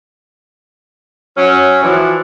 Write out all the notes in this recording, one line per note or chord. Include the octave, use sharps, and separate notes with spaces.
F#3 C#4
E3 F3 D4 E4 F#4